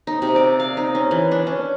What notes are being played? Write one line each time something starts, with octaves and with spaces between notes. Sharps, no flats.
D#4
C3
D5
F5
D#4
C#4
E3
D4
C#4